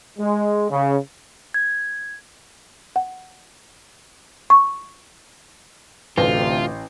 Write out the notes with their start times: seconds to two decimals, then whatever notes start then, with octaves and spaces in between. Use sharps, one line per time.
0.19 G#3
0.70 C#3
1.54 G#6
2.96 F#5
4.50 C#6
6.18 A1 D2 C3 F4 B4